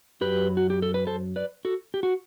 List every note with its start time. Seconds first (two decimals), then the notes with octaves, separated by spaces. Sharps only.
0.21 F#2 F#3 G4 B4
0.57 F#4
0.70 G4
0.82 A4
0.94 B4
1.07 A4 C5
1.36 B4 D5
1.65 F#4 A4
1.94 G4
2.03 F#4